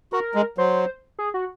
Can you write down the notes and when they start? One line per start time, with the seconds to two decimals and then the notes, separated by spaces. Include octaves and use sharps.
0.13 F#4 A#4
0.35 G#3
0.58 F#3 C5
1.19 G#4
1.34 F#4